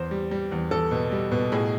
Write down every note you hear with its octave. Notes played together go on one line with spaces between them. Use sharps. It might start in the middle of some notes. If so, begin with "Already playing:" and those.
Already playing: E2 C5
G3
G3
E2
E2 A4
B2
G3
B2
A2 G#4